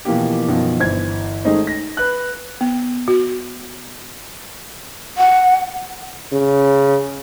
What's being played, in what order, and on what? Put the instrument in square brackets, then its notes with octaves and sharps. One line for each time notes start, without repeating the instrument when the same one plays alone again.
[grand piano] B2 E3 F3 A#3 G4
F#2 B2 D#3 F3
G1 E3 C5 G#6
D#3 G#3 A3 C#4 D#4 C5
A#6
B4 F#6
[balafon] B3
F#4
[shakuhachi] F#5
[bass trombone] C#3